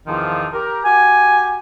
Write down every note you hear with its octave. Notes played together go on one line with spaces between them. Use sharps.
E2 C3 D#3 F3
G4 A#4
F#4 G4 G#5